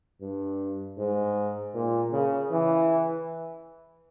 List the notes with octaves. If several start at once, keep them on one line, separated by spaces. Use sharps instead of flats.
G2
G#2
A#2
C#3
E3